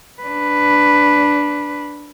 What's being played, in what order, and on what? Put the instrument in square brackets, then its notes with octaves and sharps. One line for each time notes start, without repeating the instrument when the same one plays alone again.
[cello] D4 B4